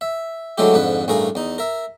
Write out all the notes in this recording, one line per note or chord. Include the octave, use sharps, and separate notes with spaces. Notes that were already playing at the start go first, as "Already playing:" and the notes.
E5
D3 F#3 G#3 A3 E4 G4
F2 G#2 D3 B4
A1 G2 A3 G#4 A#4 F5
E2 D#4
A#4 E5